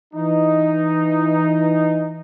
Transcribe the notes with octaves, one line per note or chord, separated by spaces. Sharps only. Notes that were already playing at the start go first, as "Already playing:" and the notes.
E3 D#4